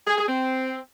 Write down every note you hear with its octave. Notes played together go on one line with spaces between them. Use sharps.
G#4
G#4
C4